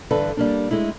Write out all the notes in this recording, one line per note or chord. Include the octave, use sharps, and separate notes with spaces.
G2 D3 E3 A4 B4
G3 A#3 D4
G#3 A3 E4